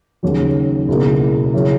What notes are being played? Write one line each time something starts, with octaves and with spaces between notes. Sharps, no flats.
D#2 C#3 F#3
C#2 B2 A#3 E4
C#3 F#3 C#4 E4